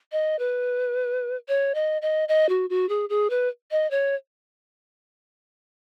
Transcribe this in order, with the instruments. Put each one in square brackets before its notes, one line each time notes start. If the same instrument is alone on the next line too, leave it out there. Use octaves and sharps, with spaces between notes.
[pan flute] D#5
B4
C#5
D#5
D#5
D#5
F#4
F#4
G#4
G#4
B4
D#5
C#5